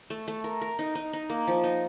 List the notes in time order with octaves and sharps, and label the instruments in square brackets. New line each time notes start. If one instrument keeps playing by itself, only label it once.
[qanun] A3
A3
A#4
A#4
D#4
D#4
D#4
A#3
F3
D#4